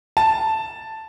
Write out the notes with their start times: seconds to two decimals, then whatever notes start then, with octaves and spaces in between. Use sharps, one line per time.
0.17 A5